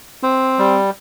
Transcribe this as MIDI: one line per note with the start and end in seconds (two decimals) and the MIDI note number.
0.23 0.78 60
0.59 0.90 55